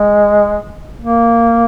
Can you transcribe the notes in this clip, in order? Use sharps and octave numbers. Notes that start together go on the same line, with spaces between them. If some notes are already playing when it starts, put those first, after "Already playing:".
Already playing: G#3
A#3